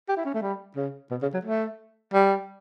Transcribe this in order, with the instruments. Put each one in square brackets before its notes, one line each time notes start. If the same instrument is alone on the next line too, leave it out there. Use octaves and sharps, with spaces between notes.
[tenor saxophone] G4
E4
C#4
A3
G3
C#3
B2
C#3
F#3
A3
G3